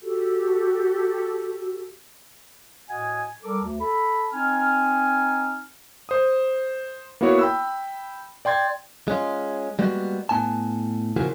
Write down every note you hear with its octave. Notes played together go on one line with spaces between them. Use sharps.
F#4 G4 A4
A2 F#4 D#5 F#5 G#5
G3 A4 A#4 D6
D2
A4 B5
C4 D#4 G#5 F6
C5 D#6
A#3 B3 E4 F#4 C#5
G5 B5 E6
D5 G5 C6 G#6 A6
G#3 C#4 F4
G3 G#3 A#3 B3 F#4
A2 B3 C#4 G#5 A5
C#3 E3 F3 A#3 F#4 G#4